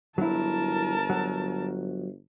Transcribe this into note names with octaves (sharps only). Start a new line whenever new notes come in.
G1 F#3 E4 A#4 A5
F#3